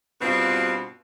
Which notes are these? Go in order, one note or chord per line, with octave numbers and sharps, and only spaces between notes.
G2 B2 B3 C4 F4 F#4